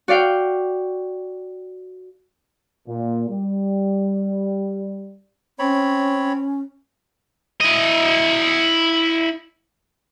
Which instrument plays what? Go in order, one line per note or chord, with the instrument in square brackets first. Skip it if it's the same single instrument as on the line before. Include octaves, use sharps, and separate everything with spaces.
[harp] F#4 D5 F5 G5
[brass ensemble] A#2
G3
[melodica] C4 C#5 B5 [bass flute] C#4
[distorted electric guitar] E4 D#5